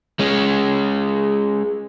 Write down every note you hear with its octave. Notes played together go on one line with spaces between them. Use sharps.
G#3 C#4